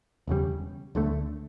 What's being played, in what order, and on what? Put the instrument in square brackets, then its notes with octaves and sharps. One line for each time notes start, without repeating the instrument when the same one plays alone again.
[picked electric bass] E1 E2 C#3 G3
D2 D3 A3